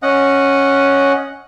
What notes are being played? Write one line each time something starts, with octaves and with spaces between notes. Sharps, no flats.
C#4 D#5 F#5